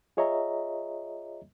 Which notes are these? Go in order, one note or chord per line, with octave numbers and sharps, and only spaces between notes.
F4 G#4 C#5 D#5 E5 A#5